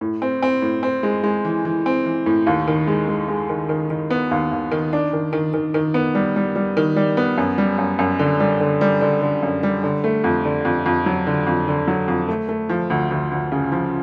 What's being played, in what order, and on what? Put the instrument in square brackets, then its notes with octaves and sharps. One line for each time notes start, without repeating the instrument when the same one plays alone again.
[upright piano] A2
C4
C4
A2
C4
G#3
G#3
E3
E3
C4
E3
A2
D#2
D#3
G#3
G#3
G#3
D#3
D#3
D#3
B3
D#2
D#2
D#3
D4
D#3
D#3
D#3
D#3
B3
G3
G3
G3
D#3
G3
B3
F#2
G3
F#2
F#2
D3
G3
D3
G3
D3
D3
F#2
G3
D3
A3
F2
D3
F2
F2
F#3
D3
F2
D3
F#3
F2
A3
A3
F3
D2
D2
D2
C#3
F3